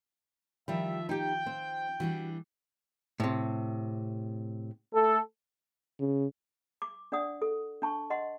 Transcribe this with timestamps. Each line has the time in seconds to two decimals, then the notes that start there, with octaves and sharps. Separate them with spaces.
0.68 D#3 F3 G3 F4 E5
1.09 D#4 G4 G5
1.46 C4
2.00 E3 G3 D4 F#4
3.20 A2 C3
4.94 A3 A4
6.00 C#3
6.82 D6
7.12 D4 D5 F#5 D#6
7.42 A4
7.82 D4 A5 C#6
8.10 D#5 F#5 C6